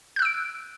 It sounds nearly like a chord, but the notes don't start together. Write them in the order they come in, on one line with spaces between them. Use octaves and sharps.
G6 F#6 E6 D7